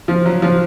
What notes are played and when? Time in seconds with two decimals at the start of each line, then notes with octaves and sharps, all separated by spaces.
0.08 F3
0.26 F#3
0.42 F3